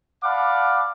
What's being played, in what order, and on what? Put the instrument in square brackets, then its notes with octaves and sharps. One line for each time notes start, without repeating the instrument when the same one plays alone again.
[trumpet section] D5 F5 F#5 A5 B5 D6